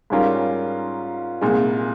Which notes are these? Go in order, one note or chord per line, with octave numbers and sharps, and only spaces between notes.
G#2 G3 C#4 F4 A#4
C2 A#2 G#3